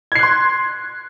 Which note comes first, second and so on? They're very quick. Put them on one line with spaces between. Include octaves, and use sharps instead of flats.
G#6 C7 F#6 C6